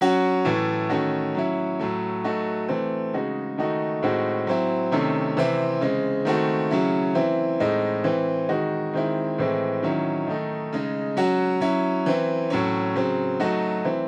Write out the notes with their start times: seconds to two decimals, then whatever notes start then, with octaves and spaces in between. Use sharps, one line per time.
0.01 F#3 C#4 F#4
0.45 A2 E3 A3
0.90 D#3 A3 C#4 F#4
1.35 F#3 C#4 E4
1.79 A2 F#3 A3
2.24 F#3 A3 D#4 F#4
2.68 E3 A3 C4
3.13 C#3 G#3 D#4 F#4
3.58 D#3 A3 D#4 F#4
4.02 A2 G#3 C4 D#4 F#4
4.47 F#3 C4 E4
4.92 C3 D#3 A3 C#4
5.37 C3 E3 C4 E4
5.81 C#3 G#3 C4
6.25 D#3 A3 C4 F#4
6.70 C#3 F#3 C#4 E4
7.15 E3 C4 E4
7.60 A2 G#3 C4 D#4
8.04 E3 C4 E4
8.49 D#3 G#3 D#4 F#4
8.93 D#3 G#3 C4 E4
9.38 A2 E3 G#3 C4 E4
9.83 D#3 F#3 C#4 E4
10.27 D#3 A3 D#4
10.73 C#3 G#3 D#4
11.17 F#3 C#4 F#4
11.61 F#3 C#4 E4
12.06 E3 C4 E4
12.50 A2 F#3 C#4
12.95 C#3 F#3 C4
13.40 F#3 A3 D#4 F#4
13.84 E3 C4 E4